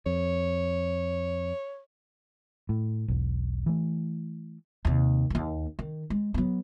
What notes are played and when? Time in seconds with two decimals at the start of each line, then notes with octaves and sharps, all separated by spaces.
0.06 F2 C#5
2.69 A2
3.08 E1 B1
3.66 E3 A3
4.85 D#2 C3
5.30 D#2 A#3
5.79 D#3
6.10 G#3
6.34 F#3 B3